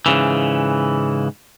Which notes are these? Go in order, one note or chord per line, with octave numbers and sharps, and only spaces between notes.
G#2 C#3 E3